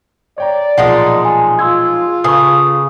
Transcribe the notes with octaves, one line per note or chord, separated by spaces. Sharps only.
C#5 D5 G5 A#5
B1 A#2 F3 G#3 D#4 F#5
G#5
F4 C6 E6 G#6
C#3 A4 B4 C#6 D#6